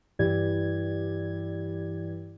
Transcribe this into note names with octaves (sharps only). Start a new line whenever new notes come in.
G2 E3 E4 G4 D5 G#6